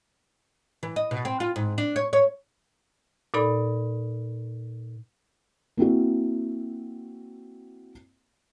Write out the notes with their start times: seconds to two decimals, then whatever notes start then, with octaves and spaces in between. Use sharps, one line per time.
0.83 E3
0.96 D#5
1.11 B2
1.25 C4
1.40 F4
1.56 G#2
1.78 D4
1.96 C#5
2.13 C#5
3.34 A#2 D#4 A4 D5 B5
5.77 A#3 C4 E4 F#4